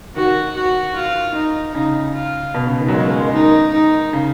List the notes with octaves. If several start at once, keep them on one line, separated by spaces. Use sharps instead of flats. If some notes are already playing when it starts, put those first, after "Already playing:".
D#3 F#4
F#4
F4
D#4
C#3 D#4
F4
B2
C#3
D#3
F#3
G#3 C#4
A#3
G#3
D#3 D#4
D#4
C#3